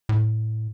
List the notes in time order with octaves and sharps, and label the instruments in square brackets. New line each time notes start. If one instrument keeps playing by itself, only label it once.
[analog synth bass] A2